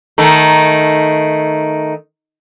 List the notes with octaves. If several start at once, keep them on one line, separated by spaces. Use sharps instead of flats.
D#3 A3